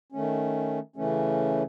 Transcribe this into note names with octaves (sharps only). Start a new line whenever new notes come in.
D#3 A3 C#4
C#3 E3 A3 C#4